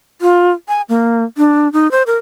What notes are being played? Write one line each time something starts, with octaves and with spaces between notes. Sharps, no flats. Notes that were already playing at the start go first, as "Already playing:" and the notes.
F4
G#5
A#3
D4
D#4
C5
A#4